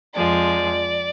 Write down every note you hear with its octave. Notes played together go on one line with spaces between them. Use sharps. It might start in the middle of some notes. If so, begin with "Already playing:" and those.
F2 F3 G#3 D5